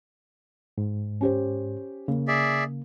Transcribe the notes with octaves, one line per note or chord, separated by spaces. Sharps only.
G#2
C#4 G4 C5
C#3 A#3
G#4 D5 E5